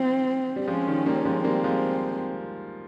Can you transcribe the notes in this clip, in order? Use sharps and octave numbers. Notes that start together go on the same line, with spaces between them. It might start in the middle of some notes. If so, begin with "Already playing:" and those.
Already playing: F3 C4
G3
F3 G#3 C#4
D#3 G3
G3 A#3
F3 G#3
G3 A#3 C4
F3 G#3